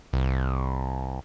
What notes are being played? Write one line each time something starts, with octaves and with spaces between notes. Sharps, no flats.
C2